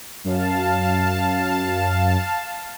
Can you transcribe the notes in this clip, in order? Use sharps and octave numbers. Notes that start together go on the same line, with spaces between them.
F#2 F5 A5